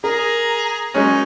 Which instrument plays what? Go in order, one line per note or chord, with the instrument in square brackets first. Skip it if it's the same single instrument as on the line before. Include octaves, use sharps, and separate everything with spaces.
[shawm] G#4 [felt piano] A#4 [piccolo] A#5
[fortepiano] F#3 G#3 C#4 [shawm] D#4